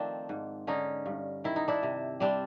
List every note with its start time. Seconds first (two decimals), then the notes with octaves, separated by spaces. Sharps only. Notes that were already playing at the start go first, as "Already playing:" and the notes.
Already playing: D#3 F3 A3 C4 D4
0.29 G#2
0.67 D3 C#4 D#4
1.06 G2
1.44 D#3 E4
1.56 D#4
1.68 D4 E4
1.83 C3
2.20 G3 C4 D4